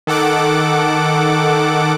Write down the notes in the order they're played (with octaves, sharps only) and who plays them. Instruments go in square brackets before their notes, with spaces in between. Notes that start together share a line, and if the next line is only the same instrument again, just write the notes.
[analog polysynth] D#3 A4 F#5 D6